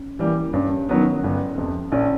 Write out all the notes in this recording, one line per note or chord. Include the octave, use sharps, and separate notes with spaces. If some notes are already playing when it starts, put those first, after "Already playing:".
Already playing: C#4
E3 G3 A#3
G2 C#4
D#3 F#3 B3
G1
F2 C3
A#1 C#4